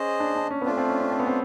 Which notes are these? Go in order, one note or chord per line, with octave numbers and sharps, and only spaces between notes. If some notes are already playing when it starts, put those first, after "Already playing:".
Already playing: C#4 G#4 C5 D#5
D4
D4
C#4
B3
A3 C4 D4 F4
C4
C#4
C#4
C4
B3
C4